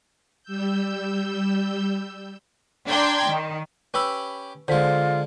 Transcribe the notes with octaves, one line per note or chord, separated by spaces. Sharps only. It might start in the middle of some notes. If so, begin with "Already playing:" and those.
G3 E6 G6
D4 D5 G5 A#5 C6 G#6
D#3
C#4 G4 B4 B5 E6
D3 G#3 F4 C5 B6